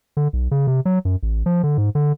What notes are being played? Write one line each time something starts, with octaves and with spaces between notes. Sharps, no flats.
D3
B1
C#3
C3
F#3
F#2
A1
F3
D3
G#2
D3